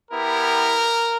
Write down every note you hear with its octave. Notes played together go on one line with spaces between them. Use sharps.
B3 E4 G4 A#4